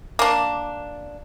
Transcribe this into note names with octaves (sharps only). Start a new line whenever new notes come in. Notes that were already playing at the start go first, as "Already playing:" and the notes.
A#3 D4